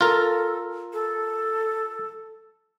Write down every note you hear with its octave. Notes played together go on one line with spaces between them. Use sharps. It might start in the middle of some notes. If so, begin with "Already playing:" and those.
F4 A4 A#4
A4